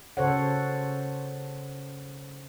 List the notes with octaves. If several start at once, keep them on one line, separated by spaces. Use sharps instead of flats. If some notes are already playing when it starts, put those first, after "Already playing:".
C#3 A4 C5 C#5 F#5